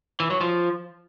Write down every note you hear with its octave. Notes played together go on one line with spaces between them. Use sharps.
E3
F#3
F3